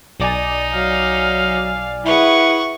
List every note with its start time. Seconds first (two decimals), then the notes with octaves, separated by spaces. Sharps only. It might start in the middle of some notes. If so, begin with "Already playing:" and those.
0.19 B1 D#4 D5 G#5
0.74 F#3 F5
2.06 E4 G#4 B4 F#5 C#6